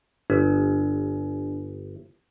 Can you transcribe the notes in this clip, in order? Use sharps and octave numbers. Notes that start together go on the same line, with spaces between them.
G1 D4